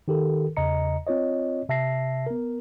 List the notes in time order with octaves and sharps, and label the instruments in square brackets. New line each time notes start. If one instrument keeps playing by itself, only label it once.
[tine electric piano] D#3 G4 A4 A#4
E2 C#3 D#5 A#5 C#7
C4 F4 C#5 D#5
C3 E5 A5 A#6 C7
B3 A#4